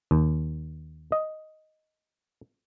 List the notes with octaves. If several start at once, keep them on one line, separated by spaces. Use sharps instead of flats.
D#2
D#5